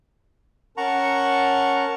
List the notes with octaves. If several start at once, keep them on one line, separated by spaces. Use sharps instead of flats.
C#4 A#4 F#5 A5 A#5 C#6